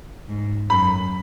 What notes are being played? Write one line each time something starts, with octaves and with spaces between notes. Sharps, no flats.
G#2
F#2 B5